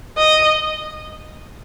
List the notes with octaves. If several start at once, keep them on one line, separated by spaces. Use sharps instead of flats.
D#5